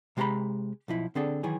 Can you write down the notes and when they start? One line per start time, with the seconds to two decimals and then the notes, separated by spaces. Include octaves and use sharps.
0.17 C3 G#3 G4 F5 A#5 B5
0.88 B1 F3 E4
1.15 D3 C4 D4 G#4 A4
1.43 D#3 E3 F#3 G#4